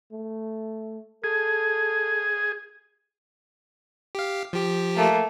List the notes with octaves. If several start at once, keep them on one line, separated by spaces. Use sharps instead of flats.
A3
G#4 A4
G4 F5
F3 G4
A3 A#3